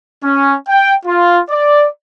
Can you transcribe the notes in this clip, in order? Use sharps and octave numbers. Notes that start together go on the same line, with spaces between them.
C#4
G5
F4
D5